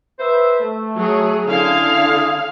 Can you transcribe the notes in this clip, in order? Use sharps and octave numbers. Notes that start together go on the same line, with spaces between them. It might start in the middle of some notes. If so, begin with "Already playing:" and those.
B4 C5 E5
A3
F#3 G#4
D3 C#4 E4 G#4 F5